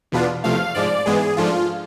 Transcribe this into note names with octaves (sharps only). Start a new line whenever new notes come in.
E2 B2 B3 D4 F4
E2 C3 F3 A3 F5
G#2 F3 G#3 D5
G#2 E3 G#3 B3 G#4
G#2 F3 A3 D4 F4